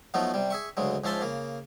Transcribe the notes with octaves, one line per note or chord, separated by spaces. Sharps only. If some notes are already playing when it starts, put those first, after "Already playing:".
F3 F#3 A3 B3 D#4
C3 G3
G#4 E5 C#6
D2 C#3 F#3 G#3
G#2 F3 C#4 E5 A5 C6
C#3 A#3